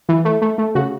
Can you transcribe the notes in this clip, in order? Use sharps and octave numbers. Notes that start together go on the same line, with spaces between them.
E3
A3
A3
A3
C#3 F#4